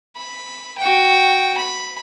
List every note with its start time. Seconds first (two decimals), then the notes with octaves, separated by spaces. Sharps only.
0.16 B5
0.78 F#4 G5
1.57 B5